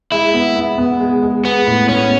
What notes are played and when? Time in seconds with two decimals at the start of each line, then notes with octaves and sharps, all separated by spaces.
0.12 G#3 E4
0.34 B3
0.56 B3
0.78 B3
1.00 G#3
1.22 G#3
1.44 G#3 B3
1.67 A2
1.89 B3 C#4